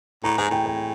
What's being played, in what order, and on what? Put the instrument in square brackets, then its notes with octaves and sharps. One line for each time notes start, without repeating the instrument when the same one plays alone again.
[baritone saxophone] A2 [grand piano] A#5
[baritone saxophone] G#2 [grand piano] G#5
[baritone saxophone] A2 [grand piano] G5
[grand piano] G5